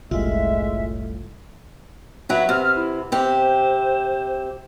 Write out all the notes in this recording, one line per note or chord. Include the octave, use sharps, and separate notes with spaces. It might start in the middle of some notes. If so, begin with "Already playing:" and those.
F#1 C2 A2 G3 G#3 F4 E5
F#3 F#4 B4 E5
C3 F6
E4
C3 G4 C5